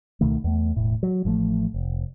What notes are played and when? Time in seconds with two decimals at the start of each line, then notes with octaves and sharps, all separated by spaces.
0.21 C#2 B2 D#3 A3
0.44 E2 A3
0.76 E1 A2
1.03 F#3
1.25 A1 F3 G3 A3
1.74 F1